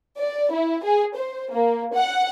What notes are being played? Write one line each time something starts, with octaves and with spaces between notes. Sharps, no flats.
D5
E4
G#4
C5
A#3
F#5